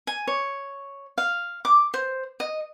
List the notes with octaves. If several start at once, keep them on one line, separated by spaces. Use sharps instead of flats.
G#5
C#5
F5
D6
C5
D#5